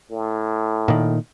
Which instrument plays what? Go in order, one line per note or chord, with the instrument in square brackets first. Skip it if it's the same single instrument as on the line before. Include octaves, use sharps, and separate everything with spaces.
[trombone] A2
[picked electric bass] A#2 D#3